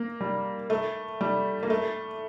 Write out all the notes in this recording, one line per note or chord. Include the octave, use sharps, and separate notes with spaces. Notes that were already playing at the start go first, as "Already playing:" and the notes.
Already playing: A#3
G3
A3
G3
A#3
A3